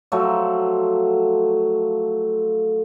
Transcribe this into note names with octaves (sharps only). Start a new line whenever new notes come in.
F3 F#3 A3